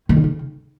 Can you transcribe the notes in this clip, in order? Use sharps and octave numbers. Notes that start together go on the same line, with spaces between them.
D#3
D#4
C#3